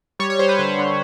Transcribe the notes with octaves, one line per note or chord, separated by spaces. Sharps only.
G3 C#5
C#5
G3 C5
B4
D3 C5
D3